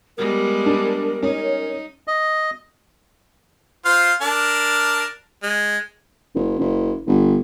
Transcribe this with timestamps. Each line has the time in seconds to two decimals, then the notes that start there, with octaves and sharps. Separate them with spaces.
0.17 G3 G#3 B3 A#4
0.66 D4
1.23 C#4 D#4
2.08 D#5
3.85 F4 C5 F5
4.22 D4 A#4 A5
5.43 G#3
6.35 F#1
6.59 F#1
7.07 G1